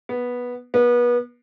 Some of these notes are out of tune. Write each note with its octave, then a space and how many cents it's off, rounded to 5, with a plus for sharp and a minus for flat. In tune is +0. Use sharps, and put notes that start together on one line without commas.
B3 -10
B3 -30